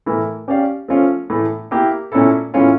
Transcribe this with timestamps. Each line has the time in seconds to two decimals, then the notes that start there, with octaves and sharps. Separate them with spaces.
0.06 A2 E3 A3 E4 A#4
0.48 C#4 G4 D5 F5
0.88 F3 A3 C#4 F4
1.30 A2 E3 A3
1.71 A#3 E4 G4
2.12 A#2 A3 C#4 E4 A4
2.54 A2 E3 A3 C#4 F4